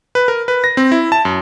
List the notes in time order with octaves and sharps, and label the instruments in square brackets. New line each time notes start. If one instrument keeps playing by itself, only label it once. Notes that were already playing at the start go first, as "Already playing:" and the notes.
[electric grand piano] B4
A#4
B4
A#6
C4
E4
A5
F#2